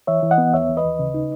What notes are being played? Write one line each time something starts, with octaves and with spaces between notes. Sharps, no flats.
E3 C#5 E5
E3
D#5 F#5
B3
D#2 C#5 E5
E3
B4 D#5
D#2
C#3
D#4